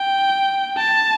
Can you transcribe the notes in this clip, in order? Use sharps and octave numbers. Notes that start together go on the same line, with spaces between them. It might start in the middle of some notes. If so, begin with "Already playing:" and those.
Already playing: G5
A5